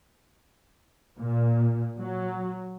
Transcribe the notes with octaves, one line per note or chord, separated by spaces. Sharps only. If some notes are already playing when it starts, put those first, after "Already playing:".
A#2
F#3